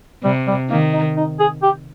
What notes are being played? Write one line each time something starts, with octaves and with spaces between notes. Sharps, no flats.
C3 G3
G3
D#3 A#3
D#4
D#4
G#4
G4